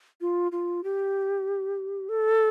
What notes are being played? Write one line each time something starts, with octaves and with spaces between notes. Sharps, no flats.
F4
F4
G4
A4